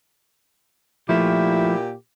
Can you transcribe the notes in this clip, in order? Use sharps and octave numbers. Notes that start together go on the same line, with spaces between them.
A#2 F3 A3 E4 G4